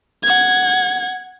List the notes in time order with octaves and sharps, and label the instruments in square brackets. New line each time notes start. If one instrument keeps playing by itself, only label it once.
[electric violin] F#5 G#6